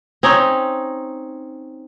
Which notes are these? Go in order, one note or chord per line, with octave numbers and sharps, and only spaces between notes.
C4 C#4 D#4 C#5